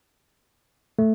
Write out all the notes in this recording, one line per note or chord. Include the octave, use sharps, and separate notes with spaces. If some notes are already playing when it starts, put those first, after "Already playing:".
A3